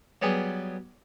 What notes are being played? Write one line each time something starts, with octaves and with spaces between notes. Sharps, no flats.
F#3 G3 B3 G#4